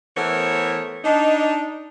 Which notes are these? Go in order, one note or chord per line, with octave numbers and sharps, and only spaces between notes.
E3 A3 B3 A#4 C5 C#5
D4 D#4